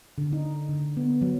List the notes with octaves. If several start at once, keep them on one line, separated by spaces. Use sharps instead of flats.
D3
D#4
D3
B3
F#3